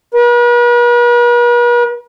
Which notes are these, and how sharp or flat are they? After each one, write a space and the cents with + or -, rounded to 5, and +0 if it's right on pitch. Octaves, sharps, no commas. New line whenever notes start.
B4 -45